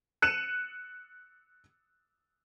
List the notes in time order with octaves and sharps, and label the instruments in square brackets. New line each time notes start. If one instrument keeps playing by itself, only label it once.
[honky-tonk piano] F#6 C#7 D#7 E7